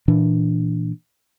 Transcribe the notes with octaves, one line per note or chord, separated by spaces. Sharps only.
A#2 E3 D4